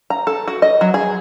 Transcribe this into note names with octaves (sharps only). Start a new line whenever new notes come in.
A#5
A4
F#4
D#5
F#3
G#4